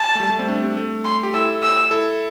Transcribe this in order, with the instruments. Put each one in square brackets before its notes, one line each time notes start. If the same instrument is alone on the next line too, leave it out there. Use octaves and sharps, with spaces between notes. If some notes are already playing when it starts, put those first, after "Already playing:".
Already playing: [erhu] A5
[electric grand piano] A3
G3
A3
G3 C4
A3 D4
G3 C4
A3
[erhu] C6
[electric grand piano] G4
[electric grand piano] E4 A4 [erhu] E6
[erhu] E6
[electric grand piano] E4 A4